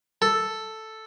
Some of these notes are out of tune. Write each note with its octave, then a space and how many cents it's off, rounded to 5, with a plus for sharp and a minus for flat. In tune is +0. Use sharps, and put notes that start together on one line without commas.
A4 +0